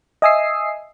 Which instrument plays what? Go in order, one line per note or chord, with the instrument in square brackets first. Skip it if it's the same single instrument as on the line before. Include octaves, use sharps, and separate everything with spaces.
[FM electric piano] D#5 E5 G#5 D#6 E6 C7